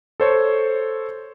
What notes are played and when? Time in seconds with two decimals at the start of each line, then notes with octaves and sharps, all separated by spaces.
0.20 A4 C5 C#5